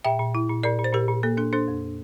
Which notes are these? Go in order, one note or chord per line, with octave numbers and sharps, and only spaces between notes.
A#2 E5 G5
A#2
E4
A#2
A#2 A#4 D5
A#2
C5
A#2 G4 A#4
A#2
A#3 A4
D4 A4
D4 A4 C5
F2